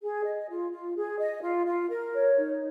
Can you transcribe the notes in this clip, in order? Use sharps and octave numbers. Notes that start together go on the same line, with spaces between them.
G#4
D#5
F4
F4
G#4
D#5
F4
F4
A#4
C#5
D#4